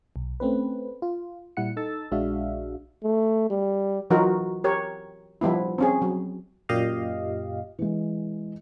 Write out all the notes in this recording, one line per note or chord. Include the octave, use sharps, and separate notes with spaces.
B1
A3 C4 C#4 B4
F4
A#2 G3 E4 F#5 C#7
D#4 A4 E6 A6
A#1 G#3 D4 F#4 E5 F5
A3
G3
E3 F#3 D#4 F4 F#4 A#4
G4 A#4 C#5
F3 G3 B3 E4
C4 C#4 G#4
F#3
F#2 A#2 G4 D#5 F5
E3 G#3